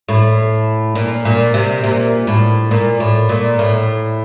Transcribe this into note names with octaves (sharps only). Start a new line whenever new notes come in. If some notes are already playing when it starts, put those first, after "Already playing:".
A2
A#2
A#2
C3
A#2
A2
A#2
A2
A#2
A2